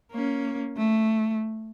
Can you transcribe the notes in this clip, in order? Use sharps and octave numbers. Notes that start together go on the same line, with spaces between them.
A#3 C#4
A3